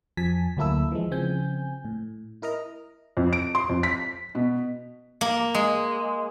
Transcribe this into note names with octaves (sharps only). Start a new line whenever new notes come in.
F2 F3 G#5 A5 B6
D2 F#3 A#3 E4 A4 E6
E3 F3 G#3
C#3 F3 C4 G#5 G6
A2
E4 A#4 D#5 A#5
F2
D7
C6
F2
B6
B2
A#3
G#3